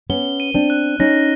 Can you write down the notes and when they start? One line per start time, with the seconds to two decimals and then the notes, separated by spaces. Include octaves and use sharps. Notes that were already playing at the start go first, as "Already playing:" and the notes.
0.10 B3 C#4 G7
0.40 D#7
0.54 C4 D4
0.70 F#6
1.00 C#4 D#4 A#6